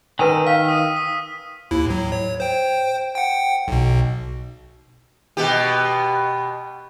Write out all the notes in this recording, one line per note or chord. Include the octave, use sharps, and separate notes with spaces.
D#3 B4 G#5 E6 D#7
F5 F6 B6
D#6 D#7
D#6
D#2 E4
A2 F#3
C#5
C5 G5
F#5 G5
B1 B2
B2 B3 G4